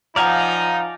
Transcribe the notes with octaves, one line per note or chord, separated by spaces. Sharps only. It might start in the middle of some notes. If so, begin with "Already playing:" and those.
F3 D#4 D5 F5 F#5 G#5 A#5